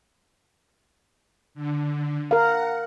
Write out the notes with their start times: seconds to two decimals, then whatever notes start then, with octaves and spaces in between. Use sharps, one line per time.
1.54 D3
2.31 A#4 F5 F#5